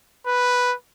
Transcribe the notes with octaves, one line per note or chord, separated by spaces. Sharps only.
B4